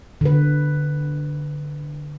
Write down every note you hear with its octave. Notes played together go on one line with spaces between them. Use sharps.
D3 B4